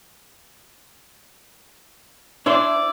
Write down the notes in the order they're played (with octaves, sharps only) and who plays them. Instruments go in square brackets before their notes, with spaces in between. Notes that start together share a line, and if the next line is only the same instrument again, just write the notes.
[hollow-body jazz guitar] D4 C5 [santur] E4 [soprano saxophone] D5